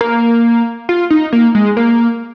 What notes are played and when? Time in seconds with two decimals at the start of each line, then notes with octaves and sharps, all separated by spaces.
0.01 A#3
0.89 F4
1.10 D#4
1.33 A#3
1.55 G#3
1.77 A#3